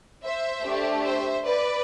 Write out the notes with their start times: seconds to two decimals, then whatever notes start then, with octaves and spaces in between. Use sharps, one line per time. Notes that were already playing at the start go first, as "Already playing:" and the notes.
0.23 C5 E5
0.64 A3 D4 G4
1.04 C5 E5
1.44 B4 D5